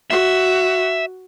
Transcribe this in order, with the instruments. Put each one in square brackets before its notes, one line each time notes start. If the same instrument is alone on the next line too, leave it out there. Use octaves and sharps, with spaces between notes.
[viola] F#4 [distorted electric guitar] E5